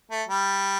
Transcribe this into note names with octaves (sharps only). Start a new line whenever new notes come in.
A3
G3